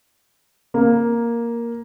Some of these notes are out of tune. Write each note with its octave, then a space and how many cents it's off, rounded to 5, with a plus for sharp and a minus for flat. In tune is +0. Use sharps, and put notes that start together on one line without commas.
A#3 +5